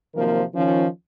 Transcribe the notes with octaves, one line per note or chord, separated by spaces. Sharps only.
C3 D#3 F3 F#3 A#3 A#4
D#3 F3 C#4